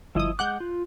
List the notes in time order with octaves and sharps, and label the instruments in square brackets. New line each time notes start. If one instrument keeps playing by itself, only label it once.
[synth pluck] G1 D#6 [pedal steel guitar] F3 E4 D#5
[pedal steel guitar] G#3 F#5 D6 [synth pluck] F#6 G6
[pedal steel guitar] F4